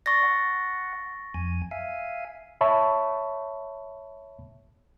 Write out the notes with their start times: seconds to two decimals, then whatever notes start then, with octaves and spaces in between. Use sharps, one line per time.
0.06 D5 C#6 A6 A#6
0.23 F#5
1.34 F2 G#5
1.71 E5 F5 G#5
2.61 C#5 E5 A5 B5 C#6